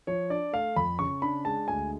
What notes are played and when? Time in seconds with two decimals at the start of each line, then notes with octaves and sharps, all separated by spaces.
0.07 F3 C#5
0.30 D4 D5
0.53 A3 F5
0.76 F2 B5
0.99 C#3 C#6
1.22 D4 B5
1.45 G#3 A5
1.68 D2 G#5